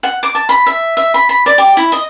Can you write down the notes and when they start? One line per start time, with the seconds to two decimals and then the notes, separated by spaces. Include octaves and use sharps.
0.03 F#5
0.23 D6
0.35 A5
0.49 B5
0.66 E5
0.97 E5
1.14 B5
1.29 B5
1.46 D5
1.58 G4
1.77 E4
1.92 D#5